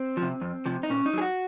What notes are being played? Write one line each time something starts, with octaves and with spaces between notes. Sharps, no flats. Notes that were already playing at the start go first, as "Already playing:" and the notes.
Already playing: C4
F3
C3
F2
C3 F3
D#4
A#2 C#4
D#4
F#3 G#4
F#4